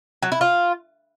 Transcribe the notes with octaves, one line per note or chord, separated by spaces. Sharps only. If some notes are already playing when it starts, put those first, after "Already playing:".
F#3
E4
F4